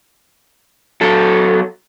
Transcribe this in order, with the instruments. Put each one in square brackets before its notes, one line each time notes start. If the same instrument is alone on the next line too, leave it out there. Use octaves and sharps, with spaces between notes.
[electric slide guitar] F#3 A4